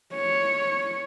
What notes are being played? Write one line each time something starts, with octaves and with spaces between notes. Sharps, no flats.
C#5